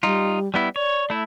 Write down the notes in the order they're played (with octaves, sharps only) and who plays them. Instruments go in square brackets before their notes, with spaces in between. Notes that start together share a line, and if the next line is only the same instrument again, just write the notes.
[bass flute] G3 [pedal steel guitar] D#4 F4
[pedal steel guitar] G3 B3 E4
[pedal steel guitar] C#5 [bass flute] D5
[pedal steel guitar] A3 E4